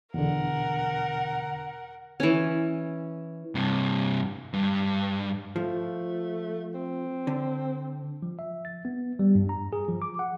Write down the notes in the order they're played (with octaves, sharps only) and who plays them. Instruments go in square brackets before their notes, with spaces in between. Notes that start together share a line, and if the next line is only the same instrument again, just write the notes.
[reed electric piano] E2 B2 D3 [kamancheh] A#4 F#5
[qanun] E3 C#4
[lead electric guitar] G2 C3
G2
[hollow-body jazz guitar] F3 [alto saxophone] A3
[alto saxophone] C4
[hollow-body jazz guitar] D3
[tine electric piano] F3
E5
A6
B3
G3
G2
A#5
G#4
F3
D6
F#5